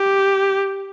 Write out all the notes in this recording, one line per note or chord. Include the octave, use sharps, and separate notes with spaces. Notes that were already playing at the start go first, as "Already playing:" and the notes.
Already playing: G4